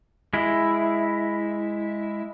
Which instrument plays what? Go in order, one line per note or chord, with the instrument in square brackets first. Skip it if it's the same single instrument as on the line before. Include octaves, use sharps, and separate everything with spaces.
[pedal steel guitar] G#3 E4